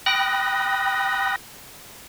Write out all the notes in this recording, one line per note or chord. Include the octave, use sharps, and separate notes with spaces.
G5 B5 D#6 F#6 A#6